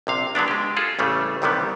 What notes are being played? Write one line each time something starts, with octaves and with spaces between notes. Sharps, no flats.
A#1 C3 F5
D3 F#3 B3 D4
G#3 G4
F4 G#4 A4
A1 C#3 G3 A3
C2 C3 D#3 E3 G3 B3